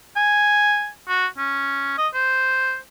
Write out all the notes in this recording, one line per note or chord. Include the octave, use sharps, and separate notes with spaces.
G#5
F#4
C#4
D#5
C5